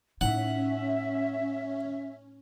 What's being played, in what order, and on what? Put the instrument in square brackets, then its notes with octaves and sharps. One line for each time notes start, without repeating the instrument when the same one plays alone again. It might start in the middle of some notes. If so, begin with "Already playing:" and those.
[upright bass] A2 D#4 [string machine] C#4 [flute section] E5 [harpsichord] F#5